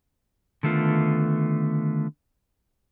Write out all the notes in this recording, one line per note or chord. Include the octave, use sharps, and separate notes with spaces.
D3 D#3 A3 B3 F4